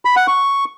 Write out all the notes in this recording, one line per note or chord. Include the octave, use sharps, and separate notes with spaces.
B5
F#5
C#6